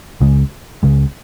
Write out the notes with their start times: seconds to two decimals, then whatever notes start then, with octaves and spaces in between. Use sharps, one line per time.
0.21 C#2 C#3 G#3
0.83 C#2 C#3 G#3